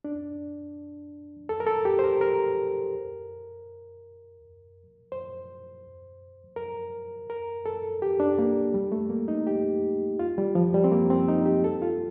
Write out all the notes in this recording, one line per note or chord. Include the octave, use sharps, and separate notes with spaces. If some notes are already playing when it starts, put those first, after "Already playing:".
D4
A4
A#4
A4
G4
C5
A#4
A#4
C5
A#4
A#4
A4
G4
D4
A#3
G3
A3
A#3
D#4
G4
F4
G3
F3
G3
C4
A#3
C4
D#4
G4
A4
F4